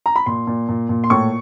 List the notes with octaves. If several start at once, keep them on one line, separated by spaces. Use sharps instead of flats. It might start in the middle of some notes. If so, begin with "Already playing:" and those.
A#5
B5
A#2 C6
A#2
A#2
A#2
C6
A2 C#6